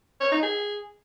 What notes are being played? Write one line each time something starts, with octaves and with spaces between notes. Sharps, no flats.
C#5
D#4
G#4